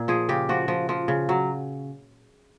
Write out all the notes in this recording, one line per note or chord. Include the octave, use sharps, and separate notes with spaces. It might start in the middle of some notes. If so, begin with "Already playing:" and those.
Already playing: A#2
F3 G#4
C#3 G4
F3 F#4
F3
F3
C#3
F#3